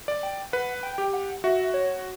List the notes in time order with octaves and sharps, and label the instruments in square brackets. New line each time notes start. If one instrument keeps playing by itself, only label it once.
[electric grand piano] D5
[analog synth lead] G5
[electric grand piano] B4 [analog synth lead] F#5
[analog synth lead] G5
[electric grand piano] G4
[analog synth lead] F#5
[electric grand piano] F#4 [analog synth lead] E5
[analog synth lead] C#5